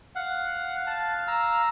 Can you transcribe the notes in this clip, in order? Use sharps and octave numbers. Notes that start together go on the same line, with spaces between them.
F5 F#5
A5 F#6
A#5 E6